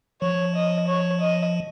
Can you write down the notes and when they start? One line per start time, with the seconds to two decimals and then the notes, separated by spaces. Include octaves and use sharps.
0.22 F3 C#5
0.55 D#5
0.88 C#5
1.21 D#5